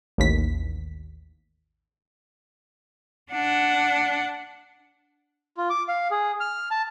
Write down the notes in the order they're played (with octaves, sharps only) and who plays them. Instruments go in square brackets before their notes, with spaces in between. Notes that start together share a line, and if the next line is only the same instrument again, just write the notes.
[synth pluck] A1 D#2 B6
[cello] D4 F#5
[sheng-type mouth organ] F4
D6
F5
G#4
F6
A5